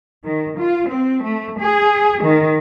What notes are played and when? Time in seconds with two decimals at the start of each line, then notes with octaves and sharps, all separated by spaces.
0.24 D#3
0.59 F4
0.90 C4
1.25 A3
1.61 G#4
2.23 D#3